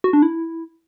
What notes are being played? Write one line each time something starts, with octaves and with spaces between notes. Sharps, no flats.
F#4
D4
E4